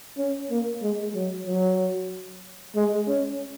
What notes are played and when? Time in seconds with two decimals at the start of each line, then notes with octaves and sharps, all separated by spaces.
0.17 C#4
0.50 A#3
0.82 G#3
1.14 F#3
1.47 F#3
2.75 G#3
3.08 C#4